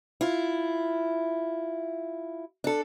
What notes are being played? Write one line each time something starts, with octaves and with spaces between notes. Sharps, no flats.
E4 F4
D4 A4